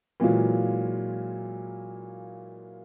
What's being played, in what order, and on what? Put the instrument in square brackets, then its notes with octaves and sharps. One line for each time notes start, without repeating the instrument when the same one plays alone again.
[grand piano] A#2 E3 F#3 G#3 A#3 F4